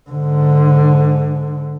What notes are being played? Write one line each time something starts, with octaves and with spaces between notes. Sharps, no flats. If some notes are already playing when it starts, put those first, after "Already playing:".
G#2 D3